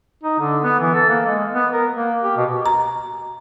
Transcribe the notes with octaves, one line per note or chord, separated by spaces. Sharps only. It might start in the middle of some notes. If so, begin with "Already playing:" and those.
D#4
D3
B3
E3
A4
A#3
G#3
B3
A#4
A#3
G4
B2
A#5